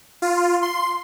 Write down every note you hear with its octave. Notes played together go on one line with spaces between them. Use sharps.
F4
C6